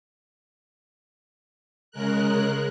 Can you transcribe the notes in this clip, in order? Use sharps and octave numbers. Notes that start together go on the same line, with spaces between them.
C#3 G#3 A#4 F#6